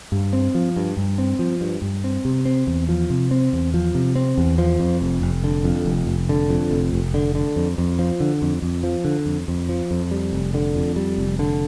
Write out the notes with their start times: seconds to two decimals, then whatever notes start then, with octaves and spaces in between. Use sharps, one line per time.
0.12 G2
0.33 C4
0.55 F3
0.76 G2
0.97 G2
1.18 C4
1.39 F3
1.61 G2
1.82 G2
2.04 C4
2.25 C3
2.45 C4
2.67 E2
2.89 F3
3.10 C3
3.31 C4
3.53 E2
3.74 F3
3.95 C3
4.15 C4
4.38 E2
4.58 F3
4.80 F2
5.02 F1
5.22 F1
5.44 D3
5.64 F2
5.86 F1
6.07 F1
6.29 D3
6.49 F2
6.71 F1
6.93 F1
7.14 D3
7.35 D3
7.56 F2
7.78 F2
7.99 F3
8.20 D3
8.42 F2
8.62 F2
8.83 F3
9.05 D3
9.26 F2
9.48 F2
9.69 F3
9.91 F2
10.11 G3
10.33 F1
10.54 D3
10.75 F2
10.96 G3
11.18 F1
11.39 D3